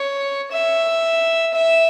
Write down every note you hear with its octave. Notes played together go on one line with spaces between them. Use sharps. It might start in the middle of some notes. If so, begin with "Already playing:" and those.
Already playing: C#5
E5
E5